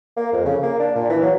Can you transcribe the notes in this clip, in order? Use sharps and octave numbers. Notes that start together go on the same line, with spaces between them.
A#3
F2
C#3
A#3
D4
A#2
E3
F#3